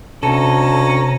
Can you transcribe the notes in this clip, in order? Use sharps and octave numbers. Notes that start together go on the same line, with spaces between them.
D2 C3 C#4 A4 A#5